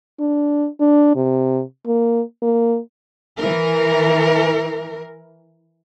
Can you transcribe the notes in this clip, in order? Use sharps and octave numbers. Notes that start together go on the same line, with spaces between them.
D4
D4
C3
A#3
A#3
E3 A#4